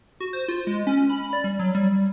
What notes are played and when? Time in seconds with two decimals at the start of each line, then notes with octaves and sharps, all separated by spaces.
0.20 F#4
0.33 C5
0.48 F4
0.67 G#3
0.87 C#4
1.10 B5
1.33 D5
1.44 G3
1.59 F#3
1.75 G3